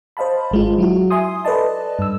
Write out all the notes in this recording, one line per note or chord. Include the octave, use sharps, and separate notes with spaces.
C5 D#5 F5 A5 B5
G#1 G#3 F4
F#3 E4 F#4
E5 G#5 C6 D#6
A4 B4 D5 D#5 A5
G2 E6